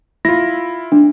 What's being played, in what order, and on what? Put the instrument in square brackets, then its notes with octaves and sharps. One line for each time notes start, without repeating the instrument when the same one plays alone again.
[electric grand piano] E4 F4 [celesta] A#6
[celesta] D4